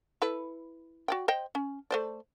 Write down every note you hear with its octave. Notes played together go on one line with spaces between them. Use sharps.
E4 A4 B4
F#4 D5 G5
C5 D#5 G5
C#4
A3 C5 D5